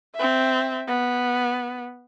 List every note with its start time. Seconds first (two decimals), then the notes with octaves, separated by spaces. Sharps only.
0.15 C4 E5
0.88 B3